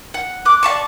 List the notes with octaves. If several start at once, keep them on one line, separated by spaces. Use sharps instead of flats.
F#5
D6 F#6
D5 F5 A5 C#6